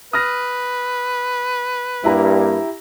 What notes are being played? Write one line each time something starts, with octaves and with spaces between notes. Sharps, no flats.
B4 D#6 F6 A#6
G2 A#3 E4 G4 A#5